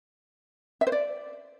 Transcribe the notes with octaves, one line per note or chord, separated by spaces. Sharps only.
E5
C5
D5